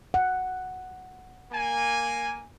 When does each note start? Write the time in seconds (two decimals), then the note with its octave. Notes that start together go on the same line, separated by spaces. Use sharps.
0.14 F#5
1.52 A#3 G#5